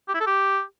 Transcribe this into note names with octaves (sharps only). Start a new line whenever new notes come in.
G4
E4
A4
G4